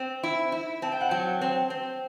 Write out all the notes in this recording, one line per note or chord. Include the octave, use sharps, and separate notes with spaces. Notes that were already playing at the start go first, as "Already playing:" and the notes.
Already playing: C4
E4
E4
C4 A5
G5
F#5
F#3 G5
C4
C4